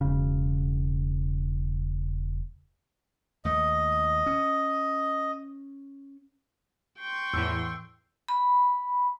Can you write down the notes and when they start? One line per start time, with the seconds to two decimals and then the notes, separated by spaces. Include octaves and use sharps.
0.01 E1 C#3
3.45 D#2 A3 D#5
4.26 C#4
7.00 G5 C6 C#6
7.34 E2 A2 E3 E6
8.28 B5